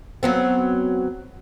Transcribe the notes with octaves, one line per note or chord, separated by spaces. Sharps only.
F#3 B3 C4